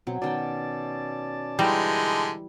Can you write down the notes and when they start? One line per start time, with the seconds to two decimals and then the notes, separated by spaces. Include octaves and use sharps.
0.07 B2 F#3 C4
0.22 B2 D#3 C#4 D5 G5 A5
1.59 D3 E3 G3 G#3 D#4